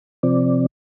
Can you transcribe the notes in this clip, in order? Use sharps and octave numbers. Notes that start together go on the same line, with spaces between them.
C3 F3 C4 D5